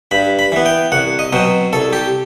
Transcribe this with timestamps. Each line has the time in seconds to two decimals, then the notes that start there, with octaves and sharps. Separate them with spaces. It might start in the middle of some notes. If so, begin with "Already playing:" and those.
0.11 G2 B5
0.39 B5
0.52 E3 B3
0.66 G5
0.92 C2 F#5
1.19 D#5
1.33 B2 F#3 C4
1.73 C2 A4
1.93 G4